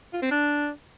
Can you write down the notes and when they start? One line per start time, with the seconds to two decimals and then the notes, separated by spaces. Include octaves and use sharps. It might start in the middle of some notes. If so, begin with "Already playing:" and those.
0.13 F4
0.22 C4
0.31 D4